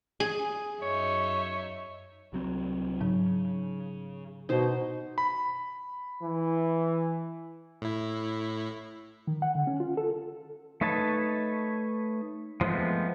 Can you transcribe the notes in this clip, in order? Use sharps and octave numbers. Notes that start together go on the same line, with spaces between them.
G#4
F#2 D#4 C#5 E5
C2 F#3 C4
G#2 C#3 F#3 D#4
B2 D#4 C5
B5
E3
A2 E4
D#3
F#5
D3
C#4
F4
A4
A3 D#4 B4 C#5 A5
F3 G#3 A3 B3 C4